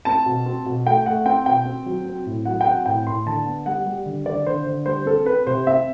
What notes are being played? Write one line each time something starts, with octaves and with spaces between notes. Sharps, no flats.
C4 A5
B2
C4
B2
A3 G5
A3 F#5
C4 G5
B2 G5
C4
F#3
C4
A2
F#3 F#5
G5
C4 F#5
A2 G5
A2 C6
D3 A5
B3
G3 F#5
G3
D3
D3 D5
D3 C5
D3
G3 C5
C4 A4
C4 B4
C3 C5
C4 E5